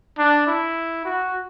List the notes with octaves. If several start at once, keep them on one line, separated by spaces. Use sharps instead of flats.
D4
E4
F#4